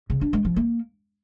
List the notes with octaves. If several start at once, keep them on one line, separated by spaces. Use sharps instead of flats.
C#3
D4
G#3
F3
A#3